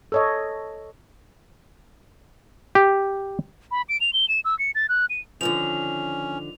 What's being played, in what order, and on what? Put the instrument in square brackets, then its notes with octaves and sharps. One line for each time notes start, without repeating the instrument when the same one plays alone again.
[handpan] A4 C#5 D#5
[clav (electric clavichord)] G4
[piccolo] B5
D7
F7
G7
E7
E6
C#7
A6
F#6
D#7
[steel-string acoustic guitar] D3 D#3 F3 [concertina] C#4 [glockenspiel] F7